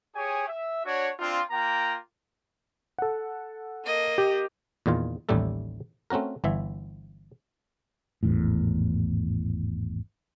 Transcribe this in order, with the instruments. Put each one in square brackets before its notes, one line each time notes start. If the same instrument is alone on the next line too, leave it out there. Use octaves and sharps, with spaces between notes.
[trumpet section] G4 G#4 C#5 G#5
E5
D4 F#4 C#5
C4 D4 F4
A#3 F4 G5 A#5
[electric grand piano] A4 F#5
[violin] A#3 D#5
[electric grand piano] G4
[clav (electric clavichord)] E2 A#2 D#3 F4
A1 D#2 A2 G3 A3 A4
A3 C4 C#4 F#4 A#4
G1 E3 E5
[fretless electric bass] G#1 E2 A2